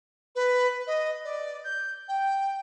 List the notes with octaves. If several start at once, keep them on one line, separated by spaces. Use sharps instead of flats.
B4
D#5
D5
G6
G5